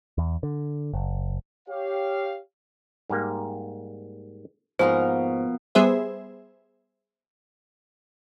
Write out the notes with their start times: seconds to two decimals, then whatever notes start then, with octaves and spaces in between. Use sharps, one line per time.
0.18 E2
0.43 D3
0.94 F#1
1.69 G4 C#5 F5
3.10 G#2 G3 A#3
4.79 G#2 B2 F3 A#3 C5 A#5
5.75 G3 B3 G#4 C5 E5